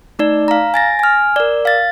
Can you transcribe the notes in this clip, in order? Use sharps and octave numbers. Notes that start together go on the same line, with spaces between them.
A3 D#4 D5
F5 A#5
G#5 A6 A#6
G#5 F6
A#4 D5
F5 A6